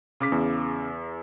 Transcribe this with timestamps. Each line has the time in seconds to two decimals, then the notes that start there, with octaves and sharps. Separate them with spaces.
0.20 C#3 D6 B6
0.32 E2